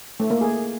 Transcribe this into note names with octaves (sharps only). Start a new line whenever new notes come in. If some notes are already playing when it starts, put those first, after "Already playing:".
A3
A#3
G#4